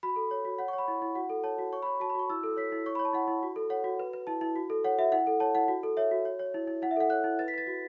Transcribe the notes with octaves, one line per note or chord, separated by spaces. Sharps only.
F#4 B5
A4
C#5
F#4
C#5 F#5
C#6
C#5 B5
E4
E4
F#4 F#5
A4
C#5 A5
F#4
C#5 C#6
B5
C#5
F#4 A5
B5
F#4 C#6
E4 E6
A4
C#5 B6
E4
C#5 C#6
B5
C#5
A5
E4 F#5
E4
F#4
A4
C#5 F#5
F#4
B4
B4
E4 A5
E4
F#4
A4
C#5 F#5
F#4 E5
E4 F#5
A4
C#5 A5
E4 F#5
F#4
A4
C#5 E5
F#4
C#5
C#5
E4
E4
E4 F#5
E5
A4 F#5
C#5 F#6
E4
B4 A6
B6
B4 A6
F#4